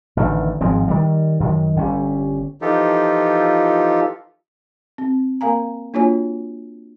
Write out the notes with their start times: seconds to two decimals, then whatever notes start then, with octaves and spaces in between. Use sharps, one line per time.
0.17 A1 D3 D#3
0.61 G#1 F3 G#3 C4
0.88 D#3 G3
1.40 F#2 D#3
1.76 G1 G3 C#4
2.61 E3 F3 D#4 F4 G4 A4
4.98 C4
5.41 A#3 A#4 F5 G#5 A#5
5.94 A#3 D4 F4 F#4 C#5 G#5